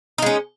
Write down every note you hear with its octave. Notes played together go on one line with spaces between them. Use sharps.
G#3 C#4 D#4